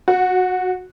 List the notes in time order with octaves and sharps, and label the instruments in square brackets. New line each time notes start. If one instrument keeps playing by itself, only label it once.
[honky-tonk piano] F#4